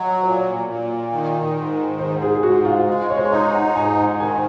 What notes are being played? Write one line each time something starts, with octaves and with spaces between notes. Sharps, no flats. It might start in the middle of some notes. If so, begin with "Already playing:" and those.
Already playing: F#3 C#5 D#5
A#2 C#5
A#2
D#3
G#2
G#2 C5
G#4
G#4
G#2 F#4
F4
G#3 F4
C#5
C5
C#5
D#4 D#5
F#5
G#2 G#5
A#5
D#3 G#5